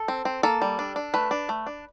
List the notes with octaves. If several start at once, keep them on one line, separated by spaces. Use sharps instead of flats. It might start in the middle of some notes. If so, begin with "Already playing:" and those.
Already playing: A4
C4
C4
A#3 A4
G3
D4
D4
A3 B4
D4
A3
D4